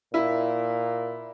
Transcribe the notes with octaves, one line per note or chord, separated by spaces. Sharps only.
A#2 E4